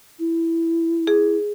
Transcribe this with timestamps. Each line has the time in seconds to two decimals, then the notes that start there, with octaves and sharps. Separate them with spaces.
0.19 E4
1.07 G#4